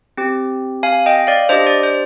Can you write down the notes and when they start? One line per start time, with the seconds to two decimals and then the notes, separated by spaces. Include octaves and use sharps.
0.17 C4 G4
0.83 F5 G#5
1.06 D#5 G5
1.27 D5 F5
1.49 D4 G4 C5 D#5
1.66 D5
1.83 C5